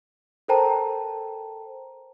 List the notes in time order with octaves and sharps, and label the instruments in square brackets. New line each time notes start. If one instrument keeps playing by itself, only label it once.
[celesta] A4 A#4 C5 G5 A5 A#5